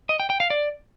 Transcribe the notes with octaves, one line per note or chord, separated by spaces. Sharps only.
D#5
G5
G5
F5
D5